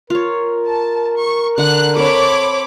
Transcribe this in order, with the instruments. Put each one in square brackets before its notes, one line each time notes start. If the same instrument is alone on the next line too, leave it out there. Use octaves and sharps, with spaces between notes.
[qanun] F4 C#5 [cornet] A#4
[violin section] A5
C#6
[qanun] D3 F#5 [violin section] F#6
[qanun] C4 A4 [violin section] C#5 B5 D6